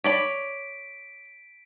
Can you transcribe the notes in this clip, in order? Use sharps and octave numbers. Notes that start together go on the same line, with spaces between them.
C#5 D5 B5 B6 D7